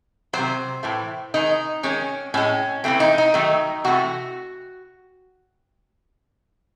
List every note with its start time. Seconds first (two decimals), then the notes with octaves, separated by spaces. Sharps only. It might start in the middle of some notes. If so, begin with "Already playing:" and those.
0.33 C3 D#3 F#3 C5
0.83 A2 E3 A3
1.34 D#3 G#3 D#4
1.83 D#3 G#3 C#4
2.34 A2 G#3 C#4
2.84 C#3 E3 A3 C4
3.00 D#4
3.18 D#4
3.34 D#3 F#3 A3
3.84 C3 E3 A3 F#4